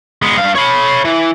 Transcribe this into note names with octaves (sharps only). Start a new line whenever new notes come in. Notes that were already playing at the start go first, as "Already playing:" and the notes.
G#3 B3
G2 F5
C#5 B5
E3